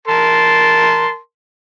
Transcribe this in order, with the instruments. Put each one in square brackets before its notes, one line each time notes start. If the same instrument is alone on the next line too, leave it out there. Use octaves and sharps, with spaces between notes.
[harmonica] A#4 A5 C6